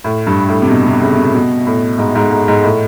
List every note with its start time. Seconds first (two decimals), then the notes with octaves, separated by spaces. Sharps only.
0.04 A2
0.27 G2
0.49 A2
0.62 C3
0.70 B2
0.86 C3
1.02 C#3
1.18 C3
1.34 B2
1.67 A2
1.98 G#2
2.15 G#2
2.31 G#2
2.48 G#2
2.64 A2